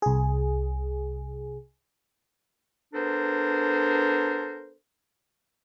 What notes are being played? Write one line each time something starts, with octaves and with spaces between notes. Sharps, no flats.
C2 G#4
B3 D4 A4 A#4 C5